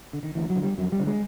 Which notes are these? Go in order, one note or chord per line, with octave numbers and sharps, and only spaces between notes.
D3
D#3
D2 E3
F#3
D3
G3
F2 F#3
G3
D3
G#3